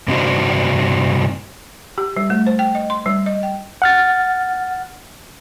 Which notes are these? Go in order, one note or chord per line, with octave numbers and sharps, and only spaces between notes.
G2 C3 D4 D#4 F#4 C5
G4
G3
A3
C5
G5
D#5
C6
G3
D#5
G5
F#5 F6 A6